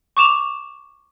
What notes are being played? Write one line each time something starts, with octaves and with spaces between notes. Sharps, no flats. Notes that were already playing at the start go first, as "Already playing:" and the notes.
C#6 D6 E7 F7